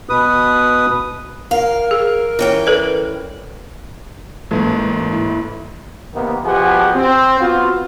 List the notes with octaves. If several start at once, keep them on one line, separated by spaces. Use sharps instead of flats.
B2 B4 D#6
A#4 F5
G#4
E3 C#4 G5
A4 B4 D5
A1 G#2 A#3 A4
E4
C3 D#3 A#3 B3
B2 F3 G4 G#4 F#5 G#5
C4
B3 F4 F#4